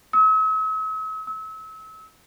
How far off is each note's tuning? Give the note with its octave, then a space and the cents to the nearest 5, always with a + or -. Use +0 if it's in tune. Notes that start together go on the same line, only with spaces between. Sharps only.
E6 -45
E6 -35